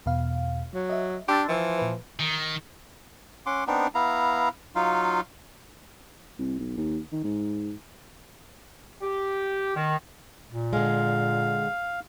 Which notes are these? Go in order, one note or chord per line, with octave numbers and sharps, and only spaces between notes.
E2 B2 F5
F#3
D#5 E5
D4 G4 C6 E6 A6
E3 F3
A#2 B4
D#3
C#4 F#5 C6 D6
B3 C4 D4 D#4
B3 E4 F5 A#5
F#3 D#4 F4 F5
C2
B1
D#2
D#3
G#2
G4
D#3
A#2
D3 G#3 F5